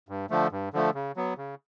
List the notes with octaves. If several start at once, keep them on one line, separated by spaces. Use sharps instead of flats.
G2
D3 F3 A3
G2
D3 F3 A3
C#3
F#3 B3
C#3